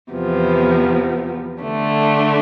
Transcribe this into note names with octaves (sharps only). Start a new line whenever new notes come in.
E2 C3 F3 B3
D3 A3 D4